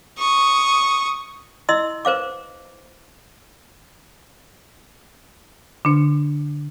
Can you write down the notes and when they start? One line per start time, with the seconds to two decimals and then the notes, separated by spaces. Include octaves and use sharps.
0.19 C#6 D#6
1.69 E4 D#5 C6 E6
2.05 B4 C5 F5 D6
5.85 D3 D4